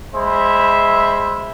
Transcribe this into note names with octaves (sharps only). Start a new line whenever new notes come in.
G#3 C5 E5 B5